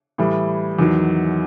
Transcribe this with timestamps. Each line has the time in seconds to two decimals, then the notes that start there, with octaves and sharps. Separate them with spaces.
0.18 A2 E3 G3
0.79 E2 D#3 F#3